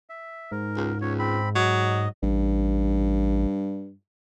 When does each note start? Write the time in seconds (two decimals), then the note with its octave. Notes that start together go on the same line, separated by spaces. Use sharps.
0.09 E5
0.51 G#2 A#4
0.76 C#2
1.01 C#2 C#5
1.19 C4 B5
1.56 F#3 D#5
2.22 A1 G2